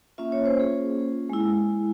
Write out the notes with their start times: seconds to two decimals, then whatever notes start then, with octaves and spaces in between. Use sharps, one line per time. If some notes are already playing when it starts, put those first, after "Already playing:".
0.18 A#3 C#4 F4 E5
0.32 C#5
0.46 C5
0.59 G#4
1.30 G#3 E4